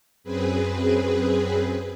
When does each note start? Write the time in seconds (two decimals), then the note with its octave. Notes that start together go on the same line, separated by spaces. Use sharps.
0.24 F#2 C4 G#4 B4